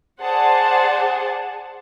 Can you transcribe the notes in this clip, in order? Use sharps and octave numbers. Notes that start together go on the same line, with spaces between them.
G#4 C5 D5 F#5 A5